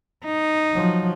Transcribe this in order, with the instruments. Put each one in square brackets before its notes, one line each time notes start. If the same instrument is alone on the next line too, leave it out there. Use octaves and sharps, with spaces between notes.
[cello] D#4
[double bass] F3 F#3